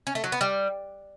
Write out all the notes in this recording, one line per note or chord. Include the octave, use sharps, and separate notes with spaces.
C#4
A3
F#3
B3
G3